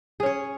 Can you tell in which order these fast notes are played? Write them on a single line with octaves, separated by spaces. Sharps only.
G#4 C#4 C#5